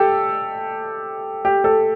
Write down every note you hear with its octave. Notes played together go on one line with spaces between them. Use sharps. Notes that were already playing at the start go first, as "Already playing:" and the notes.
Already playing: G4 A4
G4
A4